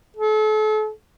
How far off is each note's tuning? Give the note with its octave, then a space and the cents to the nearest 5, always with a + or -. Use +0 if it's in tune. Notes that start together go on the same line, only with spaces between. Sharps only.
A4 -35